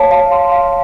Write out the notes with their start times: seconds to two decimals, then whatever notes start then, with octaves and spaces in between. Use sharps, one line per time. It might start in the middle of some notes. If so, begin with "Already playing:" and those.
Already playing: C#5 F5 A5
0.11 F5
0.32 C6
0.52 F5